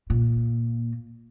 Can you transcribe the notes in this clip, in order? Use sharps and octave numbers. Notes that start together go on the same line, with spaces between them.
A#2